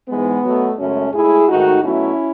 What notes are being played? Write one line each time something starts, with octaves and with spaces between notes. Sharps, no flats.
G#2 E3 G#3 B3
B2 F#3 A3
F#2 C#3 G#3 A3 C#4
A2 G#3 E4 G#4
G#2 D#3 A3 D#4 F#4
B2 F#3 A3 C#4 E4